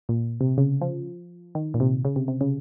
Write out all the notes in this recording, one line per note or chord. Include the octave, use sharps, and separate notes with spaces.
A#2
C3
C#3
F3
D#3
A#2
C3
C#3
C3
C3
C#3